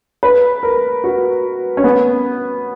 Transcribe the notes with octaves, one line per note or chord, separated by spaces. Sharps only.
B4
A#4
F#4
C#4
B3